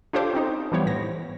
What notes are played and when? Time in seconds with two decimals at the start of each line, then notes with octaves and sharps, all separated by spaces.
0.13 D4 F4 G4 A4 C5 D6
0.34 C4 C#4 D#4
0.72 E3 F3 G3 B3 C5 C#5
0.86 A2 A#6